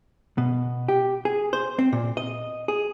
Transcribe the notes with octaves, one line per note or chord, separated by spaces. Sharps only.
B2
G4
G#4
C5
C4
A#2
D#5
G#4